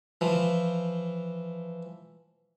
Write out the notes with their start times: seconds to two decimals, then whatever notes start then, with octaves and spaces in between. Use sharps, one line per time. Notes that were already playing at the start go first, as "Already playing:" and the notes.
0.21 E3 F3